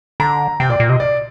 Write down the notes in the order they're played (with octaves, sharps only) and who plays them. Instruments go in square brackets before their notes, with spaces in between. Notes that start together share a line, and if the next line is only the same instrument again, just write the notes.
[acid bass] D3 [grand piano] A#5
[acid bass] C3 [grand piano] G5
[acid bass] A#2 [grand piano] D5
[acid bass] A#2
[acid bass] C3 [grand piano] D#5
[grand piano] D5